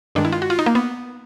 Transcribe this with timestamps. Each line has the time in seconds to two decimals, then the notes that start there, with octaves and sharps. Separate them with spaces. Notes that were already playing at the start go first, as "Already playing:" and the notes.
0.15 G2 D#3 G#3 D4
0.25 E4
0.32 F4
0.42 F#4
0.50 F4
0.59 D#4
0.66 A#3
0.75 B3